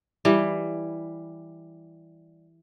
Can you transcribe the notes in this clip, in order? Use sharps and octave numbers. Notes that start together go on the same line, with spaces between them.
E3 G3